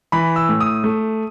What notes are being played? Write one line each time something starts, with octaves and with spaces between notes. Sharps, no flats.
E3 B5
E6
A2
D#6
A3